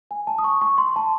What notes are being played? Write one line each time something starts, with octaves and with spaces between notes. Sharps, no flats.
G#5
A5
D#6
C#6
C#6
C6
A5